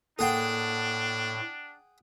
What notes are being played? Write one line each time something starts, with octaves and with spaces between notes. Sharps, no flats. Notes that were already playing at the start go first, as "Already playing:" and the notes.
A2 A#3 D4 G#4 A4 F#5 G5